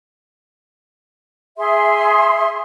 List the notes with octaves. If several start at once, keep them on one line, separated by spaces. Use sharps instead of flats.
G#4 E5 C6